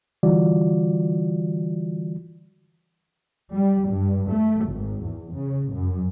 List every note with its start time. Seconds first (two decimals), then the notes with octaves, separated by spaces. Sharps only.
0.23 D3 E3 G3 F4 F#4 D5
3.52 G3
3.89 G2
4.29 A3
4.65 G#1
5.04 E2
5.33 C#3
5.72 F#2